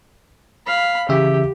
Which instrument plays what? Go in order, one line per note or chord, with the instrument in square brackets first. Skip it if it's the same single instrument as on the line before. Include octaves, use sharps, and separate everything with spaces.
[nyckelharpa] F5 B5
[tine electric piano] C#3 E3 E5 [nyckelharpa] G4